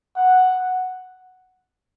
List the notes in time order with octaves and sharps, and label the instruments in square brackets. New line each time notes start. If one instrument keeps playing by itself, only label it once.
[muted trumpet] F#5